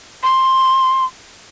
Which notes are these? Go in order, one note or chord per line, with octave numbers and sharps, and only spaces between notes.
C6